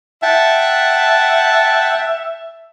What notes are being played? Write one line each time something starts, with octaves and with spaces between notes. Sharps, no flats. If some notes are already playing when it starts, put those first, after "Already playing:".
E5 F#5 G5 A5